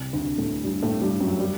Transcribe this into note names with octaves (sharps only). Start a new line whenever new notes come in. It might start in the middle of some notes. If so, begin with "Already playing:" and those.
Already playing: C2 C3
D2 D3
A2 A3
G2 G3
A2 A3
G2 G3
F#2 F#3
G3